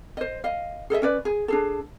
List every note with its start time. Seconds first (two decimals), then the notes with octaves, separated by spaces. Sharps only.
0.17 C5 D#5
0.44 D#5 F5
0.90 G#4 A4 D#5 E5
1.02 C#4 B4 D5
1.25 G#4
1.48 D4 G#4 A4